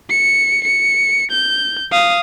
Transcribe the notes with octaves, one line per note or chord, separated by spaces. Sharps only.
C#7
C#7
G6
F5 D#6